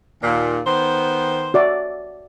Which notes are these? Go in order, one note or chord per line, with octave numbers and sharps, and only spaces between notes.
D#2 A#2
D#3 B3 C5
F#4 D5 E5